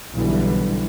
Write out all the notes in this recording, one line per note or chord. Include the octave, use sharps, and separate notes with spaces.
B1 B2 D3 E3 G3